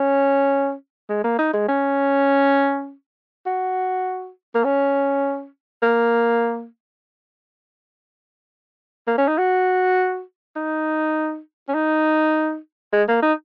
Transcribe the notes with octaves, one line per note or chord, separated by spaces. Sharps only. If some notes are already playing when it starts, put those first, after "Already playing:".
Already playing: C#4
G#3
A#3
D#4
G#3
C#4
F#4
A#3
C#4
A#3
A#3
C#4
D#4
F#4
D#4
C#4
D#4
G#3
A#3
D#4